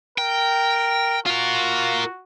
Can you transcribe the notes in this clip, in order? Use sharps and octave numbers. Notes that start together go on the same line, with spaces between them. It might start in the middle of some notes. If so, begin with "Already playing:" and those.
A#4 G5
F4 F#4 A#4